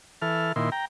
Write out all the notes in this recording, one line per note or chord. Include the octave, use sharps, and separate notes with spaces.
E3 A4 F6
A#2 D#3 E4 C6
G5 A#5